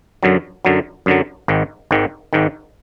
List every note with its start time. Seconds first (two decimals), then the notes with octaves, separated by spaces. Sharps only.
0.23 F#2 D3 F#3
0.65 F#2 D3 F#3
1.06 F#2 D3 F#3
1.48 G#1 G#2 D#3
1.91 G#1 G#2 D#3
2.33 G#1 G#2 D#3